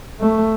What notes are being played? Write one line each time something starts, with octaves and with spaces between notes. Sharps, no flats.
A3